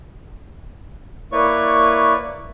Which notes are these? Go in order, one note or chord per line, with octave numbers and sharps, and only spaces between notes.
A#3 E4 B4 C#5 D5 C#6